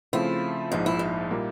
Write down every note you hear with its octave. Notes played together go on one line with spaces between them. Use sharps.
C#3 F3 A3 C4 E4 F4
A#1 G#2 F3 D#4
E4
D#4
A#2 G3 A#3